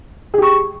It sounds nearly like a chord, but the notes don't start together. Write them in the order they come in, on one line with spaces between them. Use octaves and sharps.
G#4 G4 C#6